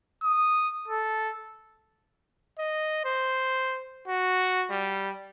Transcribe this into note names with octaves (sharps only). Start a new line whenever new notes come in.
D#6
A4
D#5
C5
F#4
G3